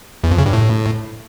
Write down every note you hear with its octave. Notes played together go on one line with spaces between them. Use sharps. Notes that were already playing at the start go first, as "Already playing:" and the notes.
E2
F2
C#3
G2
A2